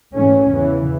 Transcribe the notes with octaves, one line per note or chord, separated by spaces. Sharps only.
G#2 E3 A3 C#4
E2 C#3 E3